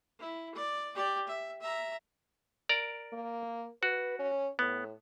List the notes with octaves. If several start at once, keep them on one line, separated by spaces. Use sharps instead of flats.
E4
D5
G4 D5
E5
E5 A#5
A#4 D5 A#5
A#3
F#4 B4
C#4
A2 B3